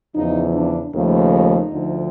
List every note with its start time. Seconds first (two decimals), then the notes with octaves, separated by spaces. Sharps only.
0.15 E2 C#3 F3 D#4
0.55 D4
0.94 D#2 C#3 F3 A3 D#4
1.73 D2 D3 F3